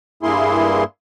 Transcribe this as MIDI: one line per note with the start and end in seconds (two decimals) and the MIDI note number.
0.23 0.84 43
0.23 0.84 58
0.23 0.84 64
0.23 0.84 68
0.23 0.84 84